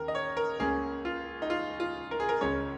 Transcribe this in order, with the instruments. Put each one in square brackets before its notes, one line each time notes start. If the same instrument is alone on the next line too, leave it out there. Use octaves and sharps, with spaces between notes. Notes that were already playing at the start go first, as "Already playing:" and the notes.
Already playing: [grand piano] D#2 C#3 A#4
D#5
C#5
A#4
C#2 C#3 A#3 C#4 G#4
F4
D#4
F4
F4
A#4
G#4
A#4
C#2 C#3 G#3 C#4 C#5